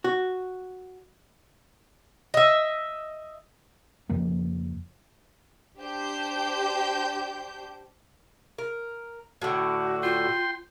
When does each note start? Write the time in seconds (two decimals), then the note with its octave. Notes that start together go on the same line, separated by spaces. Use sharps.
0.04 F#4
2.34 D#5 E5
4.09 F2 C#3 F3 A#3
5.78 D4 G4 C5 G6
8.58 A#4
9.42 A2 D3 F#4
10.03 F4 G5 C6